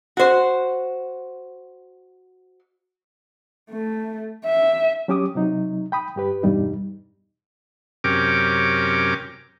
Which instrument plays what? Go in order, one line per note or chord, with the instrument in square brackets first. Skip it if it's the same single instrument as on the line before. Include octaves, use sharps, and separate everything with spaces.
[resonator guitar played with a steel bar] F#4 C5
[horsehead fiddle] A3
E5
[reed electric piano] F#3 C#4 G4 D6 D#6
C3 F#3 D#4
G5 B5 D#6
G2 G4 B4
E2 G2 B2 G3 D#4
[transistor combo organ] F#2 C3 C#4 A#4 G5 D6